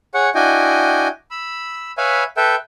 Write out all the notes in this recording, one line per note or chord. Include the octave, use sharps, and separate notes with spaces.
G#4 C#5 F#5
D4 E4 F#4 D#5 G5 G#5
B5 E6
B4 C#5 E5 F5 G#5 B5
A4 B4 E5 G5